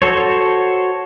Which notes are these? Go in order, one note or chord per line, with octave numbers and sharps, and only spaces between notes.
F#4 A4 C5 C#5